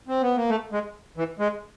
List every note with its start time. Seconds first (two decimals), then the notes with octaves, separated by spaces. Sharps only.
0.08 C4
0.23 B3
0.36 A#3
0.49 A3
0.72 G#3
1.17 E3
1.39 G#3